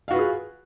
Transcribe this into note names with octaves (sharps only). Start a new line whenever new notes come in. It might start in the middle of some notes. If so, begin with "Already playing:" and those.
F4 F#4 G#4 B4 F5